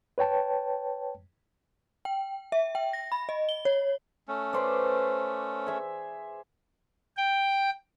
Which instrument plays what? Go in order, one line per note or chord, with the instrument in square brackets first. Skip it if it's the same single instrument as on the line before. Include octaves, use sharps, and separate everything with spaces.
[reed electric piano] B4 C#5 G5 A5
[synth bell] G5
E5
G5
A#6
B5
D#5
G7
C#5
[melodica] A3 C#4
[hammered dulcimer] B4 C5 D5
G#4 E5
[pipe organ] G5